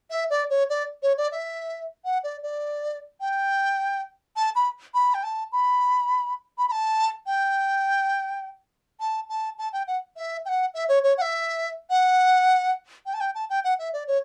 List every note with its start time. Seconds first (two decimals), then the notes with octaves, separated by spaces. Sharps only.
0.11 E5
0.30 D5
0.50 C#5
0.69 D5
1.03 C#5
1.17 D5
1.32 E5
2.05 F#5
2.24 D5
2.43 D5
3.21 G5
4.36 A5
4.55 B5
4.94 B5
5.14 G5
5.24 A5
5.52 B5
6.58 B5
6.68 B5
6.72 A5
7.26 G5
9.00 A5
9.30 A5
9.59 A5
9.73 G5
9.87 F#5
10.17 E5
10.46 G5
10.49 F#5
10.74 E5
10.89 C#5
11.04 C#5
11.18 F#5
11.22 E5
11.90 F#5
13.06 G5
13.14 A5
13.20 G5
13.35 A5
13.50 G5
13.64 F#5
13.79 E5
13.93 D5
14.07 C#5